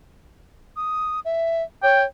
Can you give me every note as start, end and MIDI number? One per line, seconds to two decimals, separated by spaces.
0.76 1.20 87
1.25 1.63 76
1.83 2.05 73
1.83 2.03 79